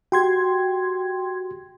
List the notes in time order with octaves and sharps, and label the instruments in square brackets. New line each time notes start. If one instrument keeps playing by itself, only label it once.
[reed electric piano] F#4 G4 [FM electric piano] G5 C6 G#6